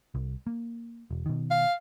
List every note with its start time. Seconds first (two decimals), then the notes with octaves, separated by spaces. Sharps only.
0.15 C2
0.47 A#3
1.11 E1
1.26 B2 D#3
1.51 F5